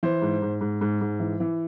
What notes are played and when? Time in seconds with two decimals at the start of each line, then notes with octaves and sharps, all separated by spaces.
0.03 E3 C5
0.22 G#2
0.42 G#2
0.61 G#2
0.81 G#2
1.01 G#2
1.20 E3
1.40 E3